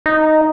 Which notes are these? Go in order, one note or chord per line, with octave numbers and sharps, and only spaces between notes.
D#4